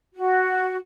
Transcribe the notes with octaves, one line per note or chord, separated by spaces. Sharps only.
F#4